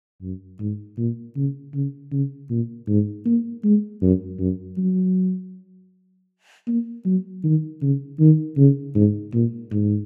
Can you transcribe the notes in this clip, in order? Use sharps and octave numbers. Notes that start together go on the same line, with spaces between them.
F#2
G#2
A#2
C#3
C#3
C#3
A#2
G#2
A#3
G#3
F#2
F#2
F#3
A#3
F#3
D#3
C#3
D#3
C#3
G#2
A#2
G#2